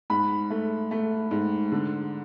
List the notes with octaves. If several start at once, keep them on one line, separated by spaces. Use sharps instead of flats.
G#2 B5
A3
A3
G#2
D3